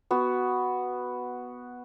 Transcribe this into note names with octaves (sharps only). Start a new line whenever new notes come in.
B3 F#4